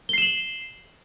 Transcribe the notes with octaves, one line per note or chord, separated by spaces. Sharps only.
C7 E7 F#7 G7